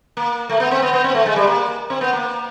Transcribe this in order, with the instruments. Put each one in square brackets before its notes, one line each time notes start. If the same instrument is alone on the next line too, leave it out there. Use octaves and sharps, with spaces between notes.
[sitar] A#3
A3
B3
C4
B3
B3
C4
A3
G#3
G3
A#3
C4
B3
A#3